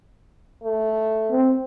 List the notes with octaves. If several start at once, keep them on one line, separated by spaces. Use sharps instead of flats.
A3
C4